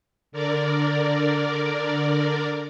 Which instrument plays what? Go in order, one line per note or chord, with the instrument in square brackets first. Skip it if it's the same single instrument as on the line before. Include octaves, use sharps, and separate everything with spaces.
[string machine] D3 A#4 D5